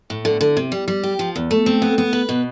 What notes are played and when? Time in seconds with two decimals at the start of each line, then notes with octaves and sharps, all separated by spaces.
0.10 A2
0.25 D3
0.41 D3
0.57 C3
0.72 G3
0.88 G3
1.03 G4
1.19 F3
1.36 E2
1.51 A3
1.66 C4
1.82 B3
1.98 B3
2.13 B4
2.29 B2